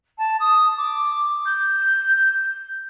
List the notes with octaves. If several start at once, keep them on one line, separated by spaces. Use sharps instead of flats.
A5
D#6
D6
G6